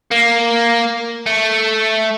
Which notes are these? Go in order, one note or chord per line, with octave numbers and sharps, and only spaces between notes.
A#3
A3